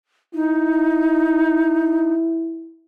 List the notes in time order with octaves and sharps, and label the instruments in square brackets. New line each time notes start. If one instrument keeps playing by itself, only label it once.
[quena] D#4 [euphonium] E4